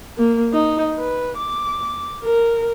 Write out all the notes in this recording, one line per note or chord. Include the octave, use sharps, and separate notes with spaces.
A#3
D#4
B4
D6
A#4